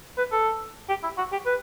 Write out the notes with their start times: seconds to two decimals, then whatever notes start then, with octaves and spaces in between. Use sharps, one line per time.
0.18 B4
0.32 A4
0.89 G4
1.03 E4
1.17 F#4
1.32 G4
1.46 B4